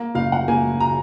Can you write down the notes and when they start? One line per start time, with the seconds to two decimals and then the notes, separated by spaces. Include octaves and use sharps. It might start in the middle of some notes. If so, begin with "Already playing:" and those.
Already playing: A#3
0.15 F#1 F5
0.32 F#5
0.48 A#3 G#5
0.80 A#5